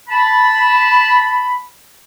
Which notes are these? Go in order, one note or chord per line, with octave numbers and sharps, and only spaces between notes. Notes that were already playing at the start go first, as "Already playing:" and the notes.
A5 B5